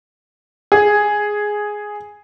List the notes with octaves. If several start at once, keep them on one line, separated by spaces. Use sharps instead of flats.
G#4